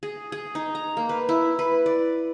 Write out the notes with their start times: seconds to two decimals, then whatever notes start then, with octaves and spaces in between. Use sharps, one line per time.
0.03 G#4
0.32 G#4
0.55 D#4
0.75 A#5
0.97 A#3
1.09 B4
1.29 E4
1.59 B4
1.86 D5